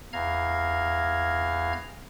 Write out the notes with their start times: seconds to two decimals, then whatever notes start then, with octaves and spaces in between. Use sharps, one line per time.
0.13 E2 F5 A#5 F6 G#6